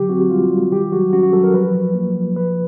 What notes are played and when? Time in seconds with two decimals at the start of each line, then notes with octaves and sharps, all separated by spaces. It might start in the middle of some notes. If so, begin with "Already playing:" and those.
Already playing: D3 F#3 G4
0.10 C4 F#4
0.30 G3 F4
0.51 G3
0.71 D#3 G4
0.92 F#3 F#4
1.13 C#4 F#4
1.23 F#4
1.33 F#3 A4
1.44 A#4
1.54 F3 B4
1.74 F3
1.95 A#3
2.15 F3
2.36 F3 B4